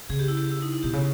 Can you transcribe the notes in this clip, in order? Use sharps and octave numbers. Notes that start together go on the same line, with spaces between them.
C#3 G#4
G4
E4
G4
E4
D#4
E4
B2 G4
C#3